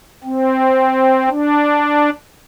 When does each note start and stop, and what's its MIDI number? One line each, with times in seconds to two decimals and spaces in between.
0.24 1.29 60
1.29 2.10 62